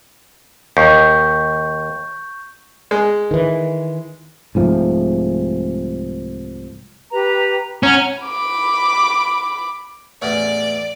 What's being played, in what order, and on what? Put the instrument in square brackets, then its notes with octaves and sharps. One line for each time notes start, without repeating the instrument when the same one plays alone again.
[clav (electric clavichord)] D#2 [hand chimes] C#6 G6
[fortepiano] G#3
[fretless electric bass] D#3 E3
C2 G#2 F3 A3
[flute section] G4 B4 A#5
[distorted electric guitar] C#4 [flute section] F#5 A#5 F6
[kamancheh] B5 D6
[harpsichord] A1 E2 C#4 [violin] D5